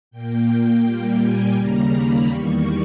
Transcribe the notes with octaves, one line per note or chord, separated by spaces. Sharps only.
A#2 A#3 G5
A#2 G3 A#3
G#5
D#2 C#3 G3 A#3 A#5
B5
E2 D#3 G3 A#3 C#6